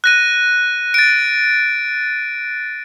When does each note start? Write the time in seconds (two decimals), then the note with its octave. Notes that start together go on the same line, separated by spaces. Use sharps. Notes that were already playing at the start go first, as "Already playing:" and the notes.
0.04 F#6 A#6 D#7
0.94 A6 D7